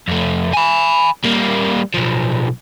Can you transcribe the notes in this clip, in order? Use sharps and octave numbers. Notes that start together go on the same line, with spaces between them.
F2 A3
G#5 B5
G3 A#3
B1 F3